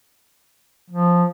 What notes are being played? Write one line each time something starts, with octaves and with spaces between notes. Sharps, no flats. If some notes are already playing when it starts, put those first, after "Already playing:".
F3